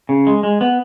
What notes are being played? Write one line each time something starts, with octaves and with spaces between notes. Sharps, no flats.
C#3
G#3
G#3
B3